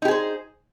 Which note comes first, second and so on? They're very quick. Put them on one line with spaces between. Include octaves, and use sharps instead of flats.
D#4 G4 G#4 C5